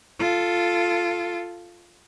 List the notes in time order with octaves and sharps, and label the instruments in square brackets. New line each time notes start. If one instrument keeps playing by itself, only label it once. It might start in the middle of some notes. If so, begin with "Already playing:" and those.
[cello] F4 A4